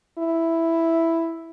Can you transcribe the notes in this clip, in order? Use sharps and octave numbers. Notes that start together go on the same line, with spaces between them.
E4